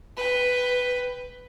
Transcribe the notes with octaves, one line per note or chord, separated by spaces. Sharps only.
B4 G5